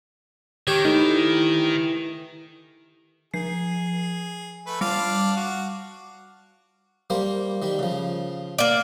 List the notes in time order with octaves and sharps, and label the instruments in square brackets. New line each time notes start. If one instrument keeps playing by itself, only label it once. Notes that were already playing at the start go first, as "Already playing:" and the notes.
[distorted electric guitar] D#3 [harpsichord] G4 C#5
[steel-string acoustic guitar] E3 A3 [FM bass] D#4
[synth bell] F3 C7 [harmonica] G#4
[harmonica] A3 B4
[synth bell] G3 [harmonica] D4 F5 D6
[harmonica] F#4
[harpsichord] G3 A#3 C5
D#3 G3
C#3 F3
[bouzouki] A#3 D5